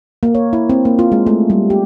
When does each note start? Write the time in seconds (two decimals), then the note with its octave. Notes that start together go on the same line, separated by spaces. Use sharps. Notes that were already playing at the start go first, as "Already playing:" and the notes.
0.23 A#3
0.35 C#5
0.53 E4
0.70 C4
0.85 A#3
0.99 F4
1.12 G#3
1.27 A3
1.50 G3
1.70 G4